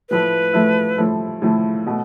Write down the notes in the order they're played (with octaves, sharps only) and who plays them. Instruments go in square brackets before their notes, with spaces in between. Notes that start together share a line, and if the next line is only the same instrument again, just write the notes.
[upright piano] A2 F3 A3 E4 [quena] B4
[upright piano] A2 F3 A3 E4
A2 F3 A3 E4
A2 F3 A3 E4
B2 A3